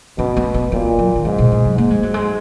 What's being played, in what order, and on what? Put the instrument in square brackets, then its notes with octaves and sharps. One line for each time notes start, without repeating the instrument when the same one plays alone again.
[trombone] B2 [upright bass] C#4
[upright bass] B3
B3
[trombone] A#2 [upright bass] A#3
[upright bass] F#3
D#3
[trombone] G#2 [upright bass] C#3
[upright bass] B2
B2
F#3
[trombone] G#2 [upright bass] A#3
[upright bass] G#3
F#3
G#3